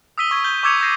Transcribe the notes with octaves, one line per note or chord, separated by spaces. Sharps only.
D#6 E6 B6 D#7 G7
C#6 G#6
G6 G7
C#6 D6 E6 G#6 C#7 F7
D#6 G6 G#6 A#6 C7 D#7